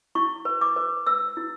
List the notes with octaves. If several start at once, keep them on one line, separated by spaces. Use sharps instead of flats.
E4 C#6
B4
D6
B4
B4 E6
E4